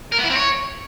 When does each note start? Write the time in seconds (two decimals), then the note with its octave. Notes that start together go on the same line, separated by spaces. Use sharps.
0.12 A#4
0.18 B3
0.24 E4
0.30 C4
0.36 C#5